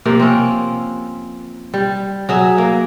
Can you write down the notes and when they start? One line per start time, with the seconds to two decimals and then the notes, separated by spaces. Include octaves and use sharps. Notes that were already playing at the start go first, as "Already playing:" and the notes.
0.05 C3 F3 A#3
0.20 C4 C#4
1.74 G3
2.29 F#3 G#4 E5
2.58 A#3